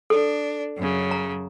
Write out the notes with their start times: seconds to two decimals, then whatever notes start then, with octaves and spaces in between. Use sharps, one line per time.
0.10 D4 A4
0.77 F#2 C#3
1.11 A#5